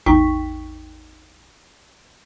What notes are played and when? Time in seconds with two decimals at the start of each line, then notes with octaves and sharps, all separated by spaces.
0.06 A1 E2 D#4 G5 C#6 B6